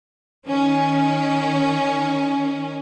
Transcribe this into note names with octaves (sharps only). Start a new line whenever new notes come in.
D#3 C#4